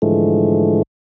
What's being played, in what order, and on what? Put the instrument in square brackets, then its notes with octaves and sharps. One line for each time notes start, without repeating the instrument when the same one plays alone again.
[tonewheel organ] G#2 D3 E3 F3 G#3 A3